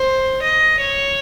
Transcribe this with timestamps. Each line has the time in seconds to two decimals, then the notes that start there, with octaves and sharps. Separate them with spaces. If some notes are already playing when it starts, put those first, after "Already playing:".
Already playing: C5
0.43 D#5
0.80 C#5